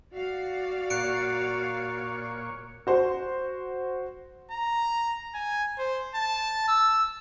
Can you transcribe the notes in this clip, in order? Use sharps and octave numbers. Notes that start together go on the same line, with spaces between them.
F#4 D5 F5
A#2 C#5 F#6 C#7 D7
F#4 C5
A#5
G#5
C5
A5
E6